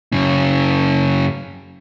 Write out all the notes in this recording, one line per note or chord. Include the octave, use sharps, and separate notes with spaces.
F#2 C#3